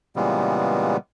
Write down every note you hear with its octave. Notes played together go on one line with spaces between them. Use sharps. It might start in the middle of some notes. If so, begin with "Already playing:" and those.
A#2 C#3 E3 G3 G#3 B3